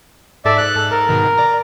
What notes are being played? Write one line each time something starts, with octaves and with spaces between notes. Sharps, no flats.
G#2 A4 D5 E5 A5
F#6
A#4
G#2 B2 D#3
D5 A#5